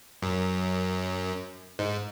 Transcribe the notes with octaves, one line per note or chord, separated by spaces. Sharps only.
F#2
G#2